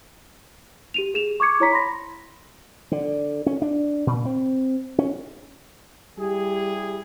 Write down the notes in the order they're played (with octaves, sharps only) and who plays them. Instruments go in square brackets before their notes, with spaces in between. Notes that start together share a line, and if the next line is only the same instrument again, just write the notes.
[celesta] G4 D#7 F7
G#4 E7 F7
C#6 D6 G#6 C#7
E4 C#5 A#5 B6
B5 C6 A#6
[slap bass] D3
C#4
D4
A#2
C4
C#4
[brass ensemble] G3 E4 G4 G#4